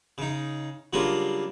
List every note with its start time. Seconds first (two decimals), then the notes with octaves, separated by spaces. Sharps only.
0.18 C#3 D#4
0.93 C#3 F#3 G3 A#3 D4 F4